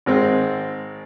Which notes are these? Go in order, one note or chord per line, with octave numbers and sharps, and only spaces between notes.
G#1 G#3 C4